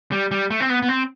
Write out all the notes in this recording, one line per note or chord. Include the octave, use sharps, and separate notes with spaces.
G3
G3
A3
C4
B3
B3
C4